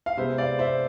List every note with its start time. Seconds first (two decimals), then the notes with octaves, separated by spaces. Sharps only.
0.06 F5
0.17 C3 G#3 B3 C5 E5
0.38 D5 F5
0.59 C5 E5